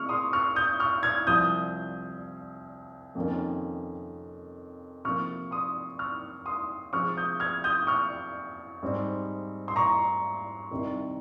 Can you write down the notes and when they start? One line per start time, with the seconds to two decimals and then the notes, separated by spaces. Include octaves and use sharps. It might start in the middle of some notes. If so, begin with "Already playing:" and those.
Already playing: C3 D#3 G#3 C4 C#6 F6
0.09 C6 D#6
0.33 C#6 F6
0.56 D#6 G6
0.80 C#6 F6
1.03 F6 G#6
1.27 C2 C3 F3 D#6 G6
3.15 F2 C3 D#3 A#3 C#4
5.05 C3 F3 A#3 C#6 F6
5.51 C6 D#6
5.99 C#6 F6
6.46 C6 D#6
6.93 C3 F3 G#3 C4 C#6 F6
7.17 D#6 G6
7.40 F6 G#6
7.64 D#6 G6
7.87 C#6 F6
8.83 G#2 G3 C4
9.68 C6
9.76 A#5 C#6
10.71 C2 C3 D#3